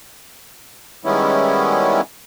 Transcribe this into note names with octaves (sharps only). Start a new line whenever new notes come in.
D#3 G3 G#3 B3 C#4 E4